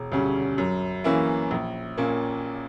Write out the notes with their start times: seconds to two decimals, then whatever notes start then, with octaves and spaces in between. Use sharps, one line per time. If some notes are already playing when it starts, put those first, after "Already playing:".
Already playing: E1
0.12 D2 C#3 G3 C#4
0.58 F#2
1.04 E3 A#3 C#4 E4
1.51 A#1
1.98 A#2 A#3 C#4